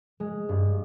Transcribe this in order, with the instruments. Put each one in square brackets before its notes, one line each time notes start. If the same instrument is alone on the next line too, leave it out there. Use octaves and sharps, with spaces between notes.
[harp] G#3
G2